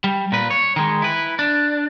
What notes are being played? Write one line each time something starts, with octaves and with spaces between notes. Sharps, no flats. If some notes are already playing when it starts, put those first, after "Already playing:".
G3
A#2 B4
C#5
D#3 G#3
E4 B4
D4